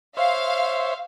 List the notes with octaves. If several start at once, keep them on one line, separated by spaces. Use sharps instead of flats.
C5 C#5 E5 F5